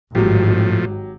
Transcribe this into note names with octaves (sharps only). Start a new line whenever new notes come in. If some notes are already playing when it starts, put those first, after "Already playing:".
G#1 A2 F3 F#3 G4